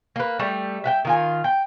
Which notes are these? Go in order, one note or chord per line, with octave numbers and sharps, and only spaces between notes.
A#3 B4
G3 A3
E5 F#5 G5
D#3 F4 G#5
G5